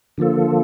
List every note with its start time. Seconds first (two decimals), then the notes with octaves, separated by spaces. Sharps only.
0.18 D3 F3 A#3 F4 A4